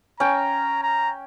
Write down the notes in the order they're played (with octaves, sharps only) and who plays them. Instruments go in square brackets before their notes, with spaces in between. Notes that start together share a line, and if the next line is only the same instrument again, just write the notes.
[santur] C#4 G5 [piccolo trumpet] A#5
[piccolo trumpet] A#5